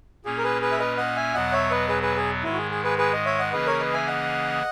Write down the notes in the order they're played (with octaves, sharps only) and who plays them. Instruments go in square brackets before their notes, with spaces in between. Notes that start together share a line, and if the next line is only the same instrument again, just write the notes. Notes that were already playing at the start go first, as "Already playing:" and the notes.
[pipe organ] A#2 A#3 C#4 [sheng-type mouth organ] G#4
[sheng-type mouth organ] A#4
G#4 B4
G#4 B4
E5
B4 D#5
D#5 F#5
E5 G#5
[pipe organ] E2 B2 F#3 B3 [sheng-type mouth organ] D#5 F#5
[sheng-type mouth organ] C#5 E5
B4 D#5
G#4 B4
G#4 B4
G#4
[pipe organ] G#2 D#3 G#3 [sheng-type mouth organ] E4
[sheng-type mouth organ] F#4
G#4
G#4
G#4 B4
G#4 B4
D#5
C#5 E5
D#5 F#5
[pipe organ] C#3 E3 A#3 C#4 G#4 [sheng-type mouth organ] B4 D#5
[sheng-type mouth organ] A#4 C#5
B4 D#5
E5 G#5
D#5 F#5